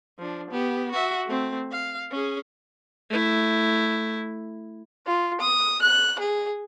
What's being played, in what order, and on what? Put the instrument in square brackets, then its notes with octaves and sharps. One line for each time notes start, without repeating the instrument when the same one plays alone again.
[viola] F3 D4
B3 G4
F#4 E5
A3 C4
F5
C#4 G#4
[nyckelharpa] A3 E4
[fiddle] F4
D#6
F#6
G#4